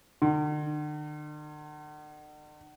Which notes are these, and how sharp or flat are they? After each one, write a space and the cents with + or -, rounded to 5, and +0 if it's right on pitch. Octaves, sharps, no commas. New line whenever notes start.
D3 +45